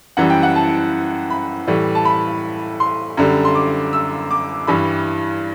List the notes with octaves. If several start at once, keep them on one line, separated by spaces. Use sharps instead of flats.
F#2 E3 G3 F#5
G5
F#5
A5
B5
A2 E3 G3
A5
B5
C6
F#2 D3 G3
C6
D6
E6
D6
G2 E3 G3 B5